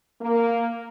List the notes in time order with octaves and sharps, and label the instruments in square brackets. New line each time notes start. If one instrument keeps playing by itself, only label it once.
[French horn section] A#3